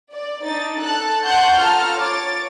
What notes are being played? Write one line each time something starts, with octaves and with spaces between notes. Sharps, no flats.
D5
D4 D#4 A6
A4 A5 F#6
F#5 A5 C6 C#6 F#6 G6
F4 A4 A5 A#5 F6
C#5 D6 A6